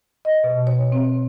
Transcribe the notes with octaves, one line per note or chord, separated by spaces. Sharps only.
D#5
B2
C#5
C4